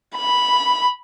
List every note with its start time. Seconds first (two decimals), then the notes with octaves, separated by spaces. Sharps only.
0.16 B5